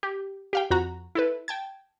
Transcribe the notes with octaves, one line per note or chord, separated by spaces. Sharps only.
G4
G4 F5 G5
F2 F#4 A#5
E4 A4 B4
G5 A5 G#6